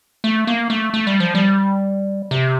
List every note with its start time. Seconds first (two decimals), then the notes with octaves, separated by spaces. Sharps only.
0.24 A3
0.47 A#3
0.70 A3
0.94 A3
1.07 G3
1.20 F3
1.35 G3
2.31 C3